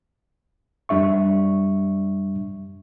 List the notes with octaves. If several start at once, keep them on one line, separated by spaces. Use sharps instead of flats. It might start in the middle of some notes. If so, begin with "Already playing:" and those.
F#2 G3 D4 E5 C#6